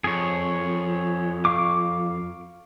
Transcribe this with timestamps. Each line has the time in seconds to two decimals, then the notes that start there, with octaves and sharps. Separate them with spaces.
0.04 F2 G#4 C#5
1.45 F5 C#6 D6